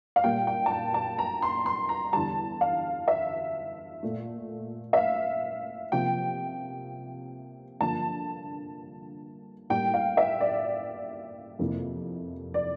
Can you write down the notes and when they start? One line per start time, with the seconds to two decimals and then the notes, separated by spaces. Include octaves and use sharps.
0.16 F5
0.24 A#2 G3 A#3 G5
0.47 G5
0.66 A5
0.71 G5
0.94 A5
1.19 A#5
1.42 C6
1.66 C6
1.89 A#5
2.13 E2 D3 G3 A5
2.61 F5
3.08 E5
4.03 A#2 A3
4.93 E5
4.97 F5
5.92 C3 F3 A#3 G5
7.81 G2 D3 F3 A#3 A5
9.70 A2 G3 A#3 G5
9.94 F5
10.17 E5
10.41 D5
11.59 F2 C3 E3 A#3
12.54 D5